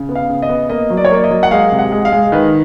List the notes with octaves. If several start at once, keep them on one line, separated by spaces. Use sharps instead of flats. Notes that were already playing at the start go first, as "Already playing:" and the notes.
Already playing: C#3
B3
F5
C#3
D#5
B3
A#3 D#5
F#3
D5
C#5
A#3 D5
D#5
F#3
F#5
G#3 F5
C3
F#5
G#3
F5
G#3
D#3 B4